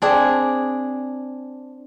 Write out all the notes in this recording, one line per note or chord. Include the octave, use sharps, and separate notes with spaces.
C4 D4 G#4